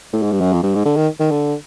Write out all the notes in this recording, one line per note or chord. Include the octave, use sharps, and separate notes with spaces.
A2
G#2
G2
F#2
F2
G2
G#2
D3
D#3
D#3
D3